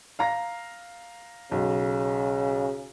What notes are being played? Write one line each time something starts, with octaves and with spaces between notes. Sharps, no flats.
F5 A#5 A#6
B1 C#3